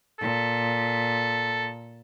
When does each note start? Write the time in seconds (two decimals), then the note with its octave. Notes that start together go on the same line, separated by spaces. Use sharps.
0.21 A#2 A4